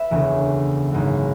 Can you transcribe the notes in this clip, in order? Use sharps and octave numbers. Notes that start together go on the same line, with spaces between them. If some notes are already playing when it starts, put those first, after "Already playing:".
Already playing: B4 E5
E1 D2 C#3 E3
G#1 F#2 E3